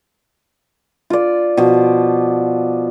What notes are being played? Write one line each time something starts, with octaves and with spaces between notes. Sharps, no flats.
F4 D5
B2 F3